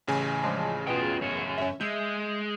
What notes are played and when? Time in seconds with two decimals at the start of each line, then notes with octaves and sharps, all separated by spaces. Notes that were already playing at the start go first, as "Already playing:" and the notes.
0.07 A1 C#3 G#5
0.43 F3 G#3 D4
0.87 B2 B3 F4 G#4 G5
1.21 F#2 C#5
1.58 C#4 E5
1.81 G#3 E5 G6